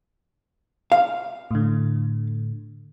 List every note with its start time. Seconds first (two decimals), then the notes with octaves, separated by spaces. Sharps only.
0.92 F5
1.51 A2 D3